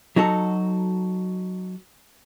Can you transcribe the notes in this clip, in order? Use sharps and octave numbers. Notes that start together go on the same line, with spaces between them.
F#3 D#4 F#4 A4